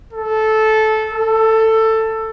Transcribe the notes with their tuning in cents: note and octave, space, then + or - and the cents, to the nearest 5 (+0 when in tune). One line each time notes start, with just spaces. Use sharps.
A4 -15
A4 +15